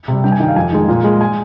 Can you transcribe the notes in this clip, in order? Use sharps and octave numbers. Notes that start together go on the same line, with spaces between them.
C3 G3
G2 G5
G#5
D#3 G3 F5 G5
F2 G#5
D#3 G#3
A#2
G#3
G#5